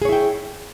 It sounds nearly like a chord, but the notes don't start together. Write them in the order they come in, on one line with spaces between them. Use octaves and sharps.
G#4 C#5 E4 G5